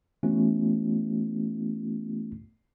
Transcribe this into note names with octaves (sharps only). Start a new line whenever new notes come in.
E3 A3 B3 C#4 E4 F#4